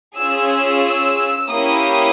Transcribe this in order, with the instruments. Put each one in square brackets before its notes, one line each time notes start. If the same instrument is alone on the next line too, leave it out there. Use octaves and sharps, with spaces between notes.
[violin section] C#4 F4 G#4 E6
E6
E6
A#3 C#4 E4 G4 D#6